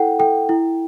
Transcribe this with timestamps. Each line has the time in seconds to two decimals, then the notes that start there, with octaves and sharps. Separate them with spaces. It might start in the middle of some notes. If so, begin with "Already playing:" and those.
Already playing: E4 A4 F#5 G5
0.19 A4 G5
0.49 E4